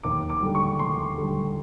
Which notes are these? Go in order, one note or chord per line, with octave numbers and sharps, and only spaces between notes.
D#2 D6
D6
D3 G3
C#6
D#2 C6
D3 G3